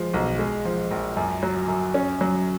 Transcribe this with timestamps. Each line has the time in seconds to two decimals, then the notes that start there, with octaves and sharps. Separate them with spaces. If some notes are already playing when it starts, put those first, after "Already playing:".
Already playing: F3 G#3
0.14 B1
0.39 G#3
0.65 F3
0.91 A#1
1.17 F#2
1.43 F#3
1.68 F#2
1.94 C#4
2.21 F#3